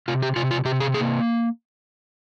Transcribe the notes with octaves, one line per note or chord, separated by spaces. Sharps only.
C3 F4
G4
C3 F4
F4
C3 G4
G#4
A#3 G#4